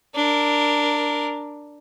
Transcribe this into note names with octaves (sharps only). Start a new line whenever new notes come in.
D4 A#4